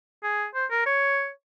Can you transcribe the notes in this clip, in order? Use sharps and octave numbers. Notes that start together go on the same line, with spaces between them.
G#4
C5
A#4
C#5